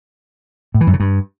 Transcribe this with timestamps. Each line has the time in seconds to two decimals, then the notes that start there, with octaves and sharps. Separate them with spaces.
0.74 A2
0.81 E3
0.87 F#2
0.93 C#3
1.00 G2